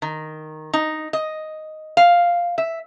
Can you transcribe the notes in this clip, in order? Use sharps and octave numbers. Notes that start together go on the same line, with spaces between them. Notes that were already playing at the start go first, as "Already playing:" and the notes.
D#3
D#4
D#5
F5
E5